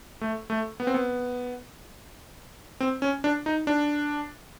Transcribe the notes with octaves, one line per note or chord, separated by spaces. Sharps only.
A3
A3
B3
C4
B3
C4
C#4
D4
D#4
D4